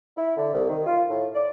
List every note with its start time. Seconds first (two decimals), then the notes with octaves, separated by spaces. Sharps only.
0.17 E4
0.37 D3
0.53 C2
0.69 D#3
0.86 F4
1.09 A2
1.35 D5